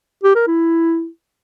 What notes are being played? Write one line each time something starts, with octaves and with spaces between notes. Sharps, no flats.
G4
A#4
E4